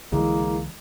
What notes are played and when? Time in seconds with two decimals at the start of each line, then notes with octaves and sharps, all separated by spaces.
0.12 C2 D3 E3 G#3 A#3 E4